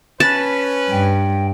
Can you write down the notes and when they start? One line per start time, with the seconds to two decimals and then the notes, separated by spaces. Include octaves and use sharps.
0.20 C#4 B4 A5
0.91 G2 G5